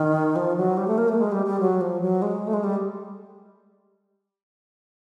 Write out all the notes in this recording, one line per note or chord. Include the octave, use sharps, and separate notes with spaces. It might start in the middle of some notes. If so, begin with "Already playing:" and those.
Already playing: D#3
F3
F#3
G3
A3
A#3
A3
G#3
G3
G3
F#3
F3
F#3
G#3
A3
G#3
G3